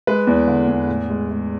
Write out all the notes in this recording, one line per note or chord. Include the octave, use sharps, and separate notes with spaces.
G#3 B4
E2
D3
E2
A2
G#3
G#3